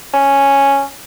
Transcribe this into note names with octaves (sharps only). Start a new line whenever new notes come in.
C#4